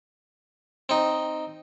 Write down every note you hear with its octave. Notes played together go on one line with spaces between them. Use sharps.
C4 D#4